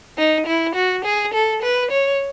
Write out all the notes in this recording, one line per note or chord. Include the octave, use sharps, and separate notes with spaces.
D#4
E4
F#4
G#4
A4
B4
C#5